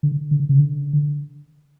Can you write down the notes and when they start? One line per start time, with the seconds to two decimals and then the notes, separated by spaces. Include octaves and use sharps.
0.03 D3
0.31 D3
0.49 C#3
0.59 D3